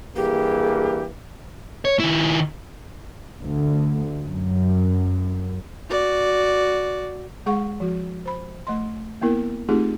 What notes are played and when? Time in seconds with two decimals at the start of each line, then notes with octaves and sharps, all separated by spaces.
0.16 G2 E3 A#3 G4 G#4
1.85 C#5
1.99 D#3 E4
3.43 D2
4.26 F#2
5.90 F#4 D5
7.46 G#3 G#4 F#5 C#6
7.80 F3 F#4
8.25 C5 B5
8.67 A3 D#5 C6
9.21 A#3 B3 E4 A#4
9.69 A3 C4 D#4 F4 G4 G#4